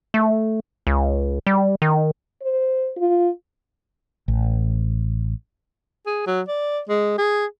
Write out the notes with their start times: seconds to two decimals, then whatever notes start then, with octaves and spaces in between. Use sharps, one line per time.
0.14 A3
0.87 C#2
1.47 G3
1.82 D#3
2.42 C5
2.97 F4
4.28 A1
6.06 G#4
6.27 F#3
6.48 D5
6.89 G#3
7.18 G#4